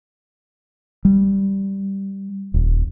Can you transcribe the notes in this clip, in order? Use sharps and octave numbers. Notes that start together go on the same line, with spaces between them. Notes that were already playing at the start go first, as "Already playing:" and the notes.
G3
D#1